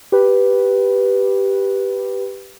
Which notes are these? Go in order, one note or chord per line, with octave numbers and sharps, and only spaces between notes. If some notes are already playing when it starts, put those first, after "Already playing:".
G4 B4